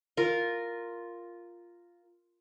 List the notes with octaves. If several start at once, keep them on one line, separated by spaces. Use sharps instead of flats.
F4 A#4